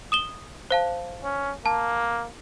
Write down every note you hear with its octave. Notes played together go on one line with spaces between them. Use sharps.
D#6 E7 G7
C5 F5 A5
C#4
A#3 A5